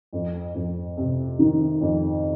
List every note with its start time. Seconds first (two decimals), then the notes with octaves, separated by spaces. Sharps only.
0.13 F2
0.54 F2
0.97 C3
1.39 D#3
1.81 F2